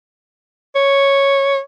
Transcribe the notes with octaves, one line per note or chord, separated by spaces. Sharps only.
C#5